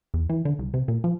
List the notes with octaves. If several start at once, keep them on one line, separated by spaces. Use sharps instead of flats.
E2
E3
D3
C2
C3
A#2
F3